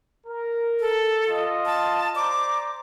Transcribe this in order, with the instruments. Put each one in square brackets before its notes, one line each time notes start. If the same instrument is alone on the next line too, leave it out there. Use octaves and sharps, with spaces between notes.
[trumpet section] A#4
[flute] A4
[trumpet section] F4 D#5
[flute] A5
[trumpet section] C5 D5 A#5 [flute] D6